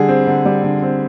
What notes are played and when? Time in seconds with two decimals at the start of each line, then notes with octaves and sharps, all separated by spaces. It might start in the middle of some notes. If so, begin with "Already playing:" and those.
Already playing: D3 G3 G#4
0.09 C4
0.27 D3
0.45 G3
0.64 D3
0.83 C4